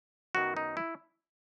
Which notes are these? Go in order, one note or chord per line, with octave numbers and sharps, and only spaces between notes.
F#2 D#3 F#3 B3 F#4
D#4
E4